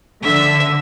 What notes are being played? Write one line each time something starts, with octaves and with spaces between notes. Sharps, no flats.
D3 E5